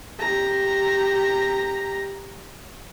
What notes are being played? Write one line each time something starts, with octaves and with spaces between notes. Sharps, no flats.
G4 A#5